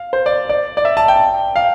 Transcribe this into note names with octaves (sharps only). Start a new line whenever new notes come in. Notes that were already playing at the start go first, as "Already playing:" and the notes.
Already playing: F5
C5
D5
D5
D5
E5
A5
G5
F5